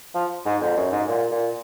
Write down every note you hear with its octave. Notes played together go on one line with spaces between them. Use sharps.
F3
G#2
F2
F#2
G#2
A#2
A#2